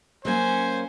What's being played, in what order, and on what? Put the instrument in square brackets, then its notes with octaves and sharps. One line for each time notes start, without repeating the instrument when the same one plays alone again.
[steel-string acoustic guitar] F#3 A#3 C#4 [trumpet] C5 [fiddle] G#5